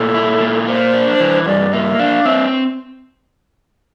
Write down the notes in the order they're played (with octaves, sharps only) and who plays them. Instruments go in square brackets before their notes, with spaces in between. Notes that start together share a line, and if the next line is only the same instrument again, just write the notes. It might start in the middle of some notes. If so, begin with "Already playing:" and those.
Already playing: [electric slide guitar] A#2 A3 [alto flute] A4
[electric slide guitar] E4
A#2
[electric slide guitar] A#3 [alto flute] C5
[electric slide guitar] D4
E3
[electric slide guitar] G2 [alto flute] D5
[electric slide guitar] A#3 [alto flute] E5
[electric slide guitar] D4 [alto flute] F5
[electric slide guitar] C4 [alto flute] E5